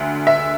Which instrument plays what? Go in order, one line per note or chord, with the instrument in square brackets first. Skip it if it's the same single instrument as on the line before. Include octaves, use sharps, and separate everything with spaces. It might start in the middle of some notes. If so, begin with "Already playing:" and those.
Already playing: [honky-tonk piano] D2 D3
E5